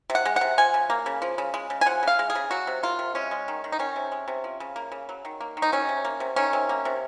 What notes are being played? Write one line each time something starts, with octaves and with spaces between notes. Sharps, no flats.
C3
F#5
G#3
C3 F#5
F3 G#5
C#3
A#3
C#3
F3
C#3
G#3
C#3
G#5
F3 F#5
C#3 F5
G#3
G#4
C#3
F#3 F#4
C3
A#3 F4
C3
G#3 C#4
G#3
D#3
D#3
D#4
D#3 C#4
C3
G#3
C3
F3
C#3
A#3
C#3
F#3
D#3
A#3
D#3
D#4
F#3 C#4
C3
A#3
C3
D#3 C#4
C3
A#3
C3